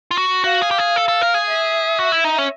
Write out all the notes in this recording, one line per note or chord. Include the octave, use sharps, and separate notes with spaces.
F4
F#4
F#4 F5
G#4
G4
G#4
A4
A4
A#4
G#4
E5
F#4
E4
D#4
C#4